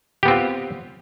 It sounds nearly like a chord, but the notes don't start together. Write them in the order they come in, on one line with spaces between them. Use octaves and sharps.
G4 B3 C4 F4